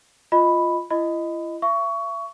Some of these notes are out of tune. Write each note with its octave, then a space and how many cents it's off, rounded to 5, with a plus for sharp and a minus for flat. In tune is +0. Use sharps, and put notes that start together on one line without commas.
F4 +0 D#5 +0 B5 +0
E4 +40 D#5 +0 B5 +20
E5 +40 C#6 +20